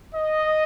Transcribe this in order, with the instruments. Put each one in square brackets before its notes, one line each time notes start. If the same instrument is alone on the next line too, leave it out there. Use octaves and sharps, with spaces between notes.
[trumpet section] D#5